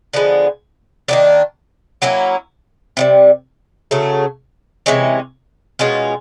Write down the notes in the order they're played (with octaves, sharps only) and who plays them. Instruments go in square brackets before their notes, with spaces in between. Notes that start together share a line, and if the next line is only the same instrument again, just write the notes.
[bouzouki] D3 F3 G#3 B3
D#3 F#3 A#3 D4
F#3 A#3 C#4 E4
C3 D#3 G3
C#3 F#3 A3
C3 E3 G#3 C#4
B2 G#3 C#4 F4